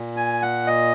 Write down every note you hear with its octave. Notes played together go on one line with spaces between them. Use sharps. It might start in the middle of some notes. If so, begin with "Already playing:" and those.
Already playing: A#2
G#5
F#5
D#5